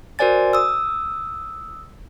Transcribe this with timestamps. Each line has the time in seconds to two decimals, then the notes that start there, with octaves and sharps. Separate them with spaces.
0.19 F#4 A#4 C5 D5 G#5 A6
0.53 D#6 E6